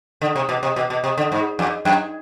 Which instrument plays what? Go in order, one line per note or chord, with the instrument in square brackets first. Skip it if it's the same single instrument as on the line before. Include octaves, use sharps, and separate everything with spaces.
[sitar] D3
C3
B2
C3
B2
B2
C3
D3
G#2
F2
F#2